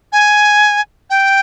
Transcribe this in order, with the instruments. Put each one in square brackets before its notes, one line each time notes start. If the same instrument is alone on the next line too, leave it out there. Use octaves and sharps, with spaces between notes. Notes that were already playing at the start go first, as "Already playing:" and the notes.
[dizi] G#5
G5